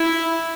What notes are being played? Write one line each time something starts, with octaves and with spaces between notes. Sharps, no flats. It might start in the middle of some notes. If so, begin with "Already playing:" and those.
Already playing: E4